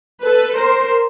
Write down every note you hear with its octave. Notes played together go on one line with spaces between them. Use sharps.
A4 B4
A#4 C5